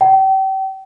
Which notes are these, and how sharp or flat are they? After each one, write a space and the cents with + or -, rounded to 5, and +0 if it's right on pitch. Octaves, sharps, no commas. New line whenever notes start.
G5 -35